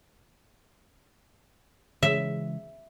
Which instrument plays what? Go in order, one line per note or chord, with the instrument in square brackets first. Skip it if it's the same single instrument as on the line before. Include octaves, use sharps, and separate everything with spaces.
[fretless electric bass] C#3 E3 G#3 [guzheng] E5